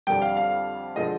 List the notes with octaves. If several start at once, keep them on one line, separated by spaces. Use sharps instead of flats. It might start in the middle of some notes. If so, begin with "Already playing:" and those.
F2 D3 G3 G5
F5
F5
D3 F3 G#3 D#5